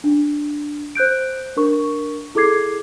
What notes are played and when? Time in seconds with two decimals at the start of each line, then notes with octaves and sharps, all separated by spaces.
0.04 D4
0.95 C5 F#6 G6 D7
1.56 D4 A#4 C#6
2.35 E4 G#4 A4 D6 G#6 C7